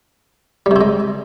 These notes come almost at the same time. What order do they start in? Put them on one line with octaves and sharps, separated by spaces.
G3 C3 C4 G#3